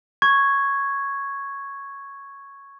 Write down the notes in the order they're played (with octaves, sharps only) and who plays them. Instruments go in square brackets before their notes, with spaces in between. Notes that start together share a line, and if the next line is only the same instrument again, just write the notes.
[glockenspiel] C#6 G#6